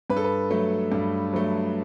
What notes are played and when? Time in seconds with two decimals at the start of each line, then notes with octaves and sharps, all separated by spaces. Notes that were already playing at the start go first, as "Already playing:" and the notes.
0.10 G2 B4
0.17 A4
0.24 B4
0.51 F#3 A3
0.92 G2
1.33 F#3 A3